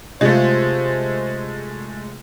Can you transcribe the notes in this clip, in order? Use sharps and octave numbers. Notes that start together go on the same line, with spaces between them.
C3 G#3 A3 F4 C5